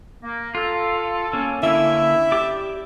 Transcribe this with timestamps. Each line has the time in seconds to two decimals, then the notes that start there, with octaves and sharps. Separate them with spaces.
0.23 A#3
0.55 F4 A4
1.33 A#3 C#4
1.63 D3 A#3 C#4 E4 E5
2.32 G4 D5 D6